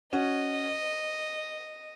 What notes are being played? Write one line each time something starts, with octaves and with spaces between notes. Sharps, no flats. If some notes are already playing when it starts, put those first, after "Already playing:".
C#4 F#4 D#5